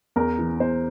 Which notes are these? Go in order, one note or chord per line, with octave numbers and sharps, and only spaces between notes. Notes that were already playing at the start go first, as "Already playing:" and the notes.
E2 A#4
E3
E2 C5